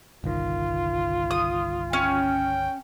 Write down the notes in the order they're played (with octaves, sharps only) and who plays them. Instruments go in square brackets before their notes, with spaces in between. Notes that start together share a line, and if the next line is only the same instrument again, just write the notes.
[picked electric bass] G1 C2 D#3 [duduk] F4
[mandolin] D#6
[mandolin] C#4 [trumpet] G5